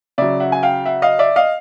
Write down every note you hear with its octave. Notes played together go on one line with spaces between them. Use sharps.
C#3 F#3 D5 E5
E5 F#5
G#5
F5 G5
E5 F#5
D#5 F5
D5 E5
D#5 F5